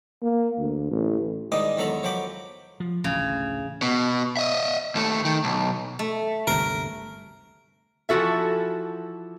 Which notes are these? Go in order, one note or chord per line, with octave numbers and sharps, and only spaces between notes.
A#3
D2
A1
G#2 D#3 G3 D#5 D6 D#6
E2 D#3 F#3 A4 A#5 B5
F3 F#3 G5 B5 D6
F3
A1 D2 C#3
B2
D#5 E5
D#2 A3
D#3
B1
A3
G1 D2 C3 A#4
E3 F3 F#4 A4 E5